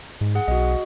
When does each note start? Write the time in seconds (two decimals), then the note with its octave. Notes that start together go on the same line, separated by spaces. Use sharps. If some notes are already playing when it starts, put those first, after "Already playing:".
0.21 G#2
0.35 G#4 F#5
0.48 B1 F#4 D#5